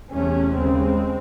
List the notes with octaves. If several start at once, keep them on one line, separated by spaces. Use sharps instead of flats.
E2 C3 A3 C#4
D#2 C#3 G#3 C4